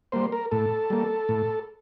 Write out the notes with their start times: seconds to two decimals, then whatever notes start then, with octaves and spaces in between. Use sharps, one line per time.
0.12 G3 A#3 C5
0.32 A#4
0.51 A2 A4
0.90 G3 A#3
1.29 A2